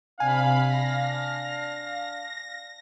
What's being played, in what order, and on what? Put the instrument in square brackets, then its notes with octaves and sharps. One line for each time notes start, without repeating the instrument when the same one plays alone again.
[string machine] C3 B5 [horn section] D4 F5 [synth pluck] G#5
[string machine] A#6